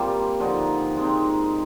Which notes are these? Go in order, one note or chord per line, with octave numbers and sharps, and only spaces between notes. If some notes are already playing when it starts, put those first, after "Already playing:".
Already playing: G3 A#3 C4 F4 A#4 C5
D3 F3 C4 D#4
G#3 C4 D#4